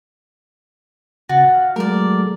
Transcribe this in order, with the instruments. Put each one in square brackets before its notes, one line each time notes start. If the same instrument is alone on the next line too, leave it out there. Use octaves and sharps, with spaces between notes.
[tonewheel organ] C#3 F#6 A6 [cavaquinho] F#4
[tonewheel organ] F5
[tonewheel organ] F#3 G#3 A3 [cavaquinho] A#4 D5